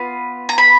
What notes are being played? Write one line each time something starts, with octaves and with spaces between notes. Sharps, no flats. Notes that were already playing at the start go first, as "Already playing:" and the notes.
Already playing: B3 F4 B5
A#5
B5